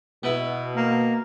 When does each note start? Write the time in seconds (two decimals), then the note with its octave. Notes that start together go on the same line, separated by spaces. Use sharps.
0.23 B2 B3 E4
0.76 A#3